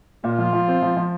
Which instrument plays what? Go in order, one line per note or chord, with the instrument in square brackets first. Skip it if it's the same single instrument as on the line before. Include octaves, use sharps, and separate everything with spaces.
[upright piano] A#2 [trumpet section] F4
[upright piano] F3
F3
C4
F3
F3